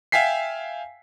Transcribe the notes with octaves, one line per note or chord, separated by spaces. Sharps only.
E5 F5 G5 G#5 B6 C7